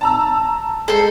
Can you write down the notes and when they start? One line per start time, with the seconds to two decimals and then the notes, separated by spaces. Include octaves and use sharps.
0.01 A5 A#5 E6
0.88 G#3 A4 C5